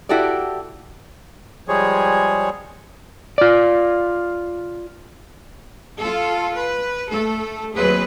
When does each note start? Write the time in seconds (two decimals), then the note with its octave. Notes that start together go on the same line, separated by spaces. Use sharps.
0.09 E4 F#4 G4 A4 D5
1.68 F3 G3 G#3 G#4 C#5
3.38 F4 D5
5.98 F4 A4
6.55 B4
7.10 A3 A4
7.75 D#2 F#3 C4 G#4 B4